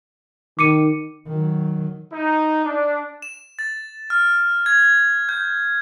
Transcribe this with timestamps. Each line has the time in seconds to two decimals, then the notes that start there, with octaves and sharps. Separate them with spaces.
0.59 D#3 D6 C#7 D#7
1.27 D#3 F#3
2.13 D#4
2.65 D4
3.22 E7
3.59 A6
4.10 F6
4.66 G#6
5.29 G6